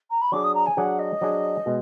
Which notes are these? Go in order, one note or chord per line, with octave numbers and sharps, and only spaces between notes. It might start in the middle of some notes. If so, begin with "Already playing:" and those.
A#5
B5
F#3 D4 G#4 D6
D#6
A#5
G#5
F#3 D4 G#4 F#5
D#5
F#3 D4 G#4
B2 G#3